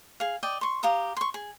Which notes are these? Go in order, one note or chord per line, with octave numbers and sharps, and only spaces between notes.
G#4 F5
D5 D#5 G5
C6 C#6
G4 F5 A#5 D#6
C6 C#6
G#4